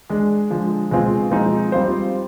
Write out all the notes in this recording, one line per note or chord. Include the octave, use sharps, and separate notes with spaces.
G#3 D4 G#4
D3 F3 G#3
B2 G#3 C4 F4 G#4
F3 G#3 C4 D#4
G3 C4 F4 C5